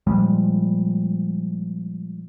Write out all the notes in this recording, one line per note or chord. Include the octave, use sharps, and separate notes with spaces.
A#2 F3 G3 G#3